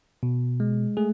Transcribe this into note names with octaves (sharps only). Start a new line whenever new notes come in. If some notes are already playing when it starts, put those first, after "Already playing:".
B2
G#3
A3 G#4